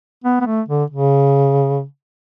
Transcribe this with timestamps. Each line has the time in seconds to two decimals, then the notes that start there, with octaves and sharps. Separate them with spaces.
0.24 B3
0.41 B3
0.46 A3
0.68 D3
0.90 C#3